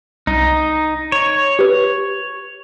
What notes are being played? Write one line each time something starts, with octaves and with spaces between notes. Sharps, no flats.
C2 D#4
C#5
G4 B4